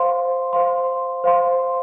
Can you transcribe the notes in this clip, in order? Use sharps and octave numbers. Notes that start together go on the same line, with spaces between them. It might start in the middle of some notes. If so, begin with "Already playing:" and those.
Already playing: C5 F5 C6
C5 F5 C6
C5 F5 C6